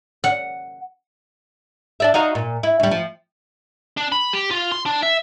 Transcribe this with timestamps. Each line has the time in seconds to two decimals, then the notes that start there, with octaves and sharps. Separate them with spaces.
0.24 F#5
2.00 D4 D5 E5
2.14 D#4 F#4 F5
2.35 A#2
2.63 E4
2.80 D2 G3
2.91 F3
3.97 D4
4.12 B5
4.33 G4
4.51 F4
4.72 C6
4.86 D4
5.03 E5